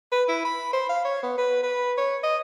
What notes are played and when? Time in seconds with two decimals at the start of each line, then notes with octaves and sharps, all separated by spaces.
0.12 B4
0.29 E4
0.45 B5
0.73 C5
0.89 F5
1.05 C#5
1.23 B3
1.38 B4
1.63 B4
1.98 C#5
2.23 D#5